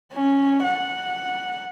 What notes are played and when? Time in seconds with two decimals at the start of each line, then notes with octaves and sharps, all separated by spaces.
0.13 C#4
0.63 F#5